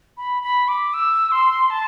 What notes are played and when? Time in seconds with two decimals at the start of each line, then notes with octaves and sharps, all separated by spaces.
0.17 B5
0.43 B5
0.68 D6
0.94 E6
1.32 C6
1.70 A5